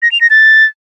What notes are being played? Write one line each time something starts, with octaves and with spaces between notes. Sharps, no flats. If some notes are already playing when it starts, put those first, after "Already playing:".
A#6
F7
A#6
A6